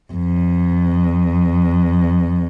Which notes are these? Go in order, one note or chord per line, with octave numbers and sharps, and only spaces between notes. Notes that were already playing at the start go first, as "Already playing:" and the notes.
F2